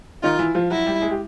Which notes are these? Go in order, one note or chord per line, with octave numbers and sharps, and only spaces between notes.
D#3 D#4 F4
E3 E4
F3 F4
F#3 E4 F#4
G3 G4
G#3 G#4
G4